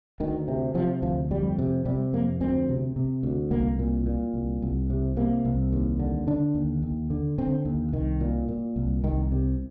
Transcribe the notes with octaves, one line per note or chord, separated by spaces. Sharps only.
D2 D#3
C3
C3 F3
D2 F3
F2 G3
C3
C3 G3
F2 A#3
D2 C4
C3
C3
D2
C2 A#3
A#2
A#2
C2
C2
C3
C3 A#3
C2
D#2
D3
D3 D4
D#2
D#2
D3
D3 C4
D#2
C2 D#3
A#2
A#2
C2
C2 D#3
C3